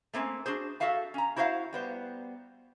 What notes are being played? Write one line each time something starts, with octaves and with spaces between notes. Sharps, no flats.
A3 A#3 C4 C#4
D4 F#4 G#4 C5
F#4 A4 E5 F5 A5
C#4 A#5
E4 F#4 C5 D#5 F5 F#5
G3 B3 C5